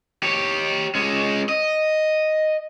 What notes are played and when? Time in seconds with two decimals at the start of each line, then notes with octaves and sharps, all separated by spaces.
0.23 G4 C#5
0.95 G#3 C#4
1.49 D#5